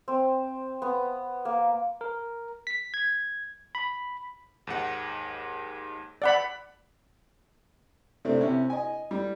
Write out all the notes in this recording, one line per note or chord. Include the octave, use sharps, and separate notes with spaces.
C4
B3
A#3
A#4
B6
G#6
B5
D#2 G#2 F#5
D5 F#5 B5
C3 A3 C4 D4
C3 C#4 E4
D#5 G#5
G3